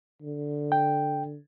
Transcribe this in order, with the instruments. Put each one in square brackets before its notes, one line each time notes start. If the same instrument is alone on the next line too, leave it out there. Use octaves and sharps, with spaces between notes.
[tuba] D3
[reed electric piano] G5